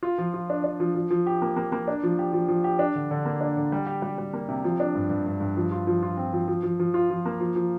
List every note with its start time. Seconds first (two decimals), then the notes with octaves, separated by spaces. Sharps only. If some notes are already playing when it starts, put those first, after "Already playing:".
0.03 F4
0.18 F3
0.34 F4
0.50 D4
0.64 D4
0.80 F3
0.95 F3
1.11 F3
1.27 G4
1.42 A#3
1.57 A#3
1.72 A#3
1.88 D4
2.03 F3
2.19 G4
2.33 F3
2.48 F3
2.64 G4
2.79 D4
2.95 D3
3.11 D3
3.25 A#3
3.41 D4
3.57 D3
3.72 G3
3.87 G4
4.02 G3
4.18 G3
4.33 A#3
4.49 C3
4.64 F3
4.80 D4
4.95 G2
5.10 G2
5.26 G2
5.40 G2
5.57 F3
5.72 F4
5.87 F3
6.03 F4
6.17 C4
6.33 F3
6.48 F3
6.63 F3
6.80 F3
6.94 F4
7.10 F3
7.26 A#3
7.40 F3
7.56 F3